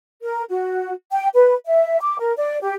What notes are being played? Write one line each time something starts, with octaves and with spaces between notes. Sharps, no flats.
A#4
F#4
G5
B4
E5
D6
A#4
D5
G4